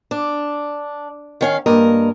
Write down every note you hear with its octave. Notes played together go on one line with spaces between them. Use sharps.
D4
D#3 C#4 F5
G2 A#3 A#4 D#5